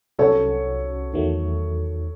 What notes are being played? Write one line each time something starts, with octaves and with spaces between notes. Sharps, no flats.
C2 C3 F#3 C#4 F#4 A4 C#5
E2 D#3 F#3 A3